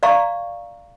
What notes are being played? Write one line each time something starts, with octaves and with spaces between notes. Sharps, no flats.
D5 F5 A#5 C#6